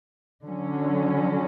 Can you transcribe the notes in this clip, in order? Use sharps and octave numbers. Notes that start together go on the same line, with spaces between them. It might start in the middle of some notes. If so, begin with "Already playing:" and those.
D3 F#3 C#4